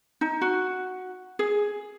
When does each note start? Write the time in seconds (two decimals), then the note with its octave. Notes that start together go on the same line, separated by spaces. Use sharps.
0.21 D#4
0.41 F#4
1.39 G#4